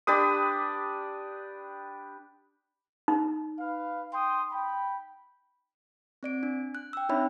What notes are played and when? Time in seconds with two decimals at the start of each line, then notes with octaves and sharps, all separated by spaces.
0.07 D4 G4 B4 D#6
3.08 D#4
3.59 B4 F5
4.13 G5 C6 D#6
4.52 G5 B5
6.23 C4 D5 D7
6.43 D4
6.75 F#6
6.93 G5 E6
7.09 C4 D4 D#4 C#5 E5 B5